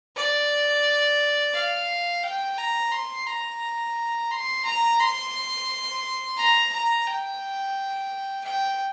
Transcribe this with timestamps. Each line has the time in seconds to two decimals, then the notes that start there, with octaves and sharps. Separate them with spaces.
0.16 D5
1.55 F5
2.23 G5
2.58 A#5
2.92 C6
3.27 A#5
4.31 C6
4.65 A#5
5.00 C6
6.37 A#5
6.73 A#5
7.07 G5
8.44 G5